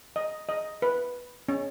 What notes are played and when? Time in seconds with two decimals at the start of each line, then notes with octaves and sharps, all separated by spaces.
0.16 D#5
0.49 D#5
0.82 B4
1.48 C#4